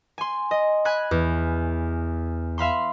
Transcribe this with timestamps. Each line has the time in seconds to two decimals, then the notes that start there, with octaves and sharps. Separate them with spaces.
0.18 G#5 C6
0.51 D#5
0.85 G#5 B5 F#6 G#6
1.11 E2
2.58 E5 F5 B5 C6